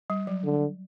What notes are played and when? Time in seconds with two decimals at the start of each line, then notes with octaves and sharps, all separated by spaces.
0.10 G3
0.27 F#3
0.44 D3